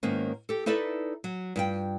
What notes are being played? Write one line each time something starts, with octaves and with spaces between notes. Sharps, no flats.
G#2 D#3 A#3 B3 C#4
G4 A4
D#4 E4 A4 B4 D5 E5
F#3
G2 F4 G5